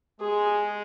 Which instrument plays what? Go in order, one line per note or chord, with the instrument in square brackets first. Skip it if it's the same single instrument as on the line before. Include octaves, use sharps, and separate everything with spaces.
[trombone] G#3 [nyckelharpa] G#4